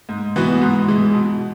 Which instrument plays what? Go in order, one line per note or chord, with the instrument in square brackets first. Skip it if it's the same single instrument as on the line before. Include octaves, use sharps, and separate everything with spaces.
[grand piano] G#2
E3 B3 F#4
G#2
E3 G#3
B2